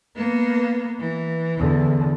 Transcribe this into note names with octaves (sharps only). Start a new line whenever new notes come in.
A#3 B3
E3
E2 D3